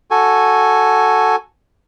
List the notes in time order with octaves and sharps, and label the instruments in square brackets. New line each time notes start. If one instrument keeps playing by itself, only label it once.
[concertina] F#4 A4 G#5